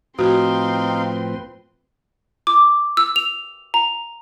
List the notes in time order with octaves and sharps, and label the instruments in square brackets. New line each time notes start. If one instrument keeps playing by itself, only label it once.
[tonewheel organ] A2 F3 B4 [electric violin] C4 C6 [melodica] D#4 F5 [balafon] F#4
[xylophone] D6
E6
F7
A#5